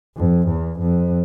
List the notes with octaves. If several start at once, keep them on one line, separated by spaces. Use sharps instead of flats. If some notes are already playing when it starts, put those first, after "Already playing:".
F2
E2
F2